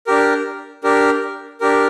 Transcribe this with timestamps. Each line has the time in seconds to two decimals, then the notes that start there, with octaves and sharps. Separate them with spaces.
0.07 D4 G4 A#4
0.84 D4 G4 A#4
1.61 D4 G4 A#4